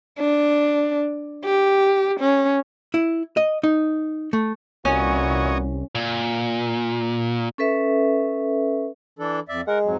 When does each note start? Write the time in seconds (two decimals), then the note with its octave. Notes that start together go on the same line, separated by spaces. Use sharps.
0.19 D4
1.45 G4
2.20 C#4
2.94 E4
3.37 D#5
3.63 D#4
4.33 A3
4.85 C2 A#2 E3 C#4 F#4 C#5 D#5
5.95 A#2
7.58 C#4 A4 B4 E5
9.19 E3 D4 A4
9.49 F2 D5 E5
9.67 G#3 A#4 F#5
9.85 F2 G#2 F#3